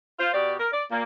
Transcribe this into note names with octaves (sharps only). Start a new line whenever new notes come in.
F4 C5
B2 G4 D5
A#4
D5
A#2 A#3